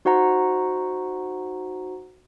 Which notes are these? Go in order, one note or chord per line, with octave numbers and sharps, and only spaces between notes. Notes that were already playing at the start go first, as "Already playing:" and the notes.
D#4 F#4 C5 F#5 A#5